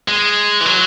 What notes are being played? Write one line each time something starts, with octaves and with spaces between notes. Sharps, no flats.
G#3
E3
F#3